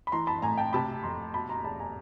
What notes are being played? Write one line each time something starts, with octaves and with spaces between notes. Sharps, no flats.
B5
E3 A#5 C6
A5 B5
A2 G#5 A#5
G5 A5
C3 A5 B5
F2 A#5 C6
B2 A5 B5
A#5 C6
E2 A5 B5
G#5 A#5